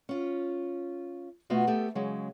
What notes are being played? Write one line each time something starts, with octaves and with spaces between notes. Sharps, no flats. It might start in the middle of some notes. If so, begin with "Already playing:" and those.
C#4 F4
B2 A3 B3 F4 F#4
A3 B3 G4 A4
C#3 F#3 G#3